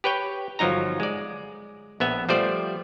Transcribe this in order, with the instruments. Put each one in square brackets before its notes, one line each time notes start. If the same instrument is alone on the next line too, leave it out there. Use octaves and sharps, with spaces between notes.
[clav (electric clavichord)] G4 B4 C#5 G5
G1 F3 F#3 D#4 A#5
G#3 D5
A#1 B3 E5
F3 G3 A3 C5 D5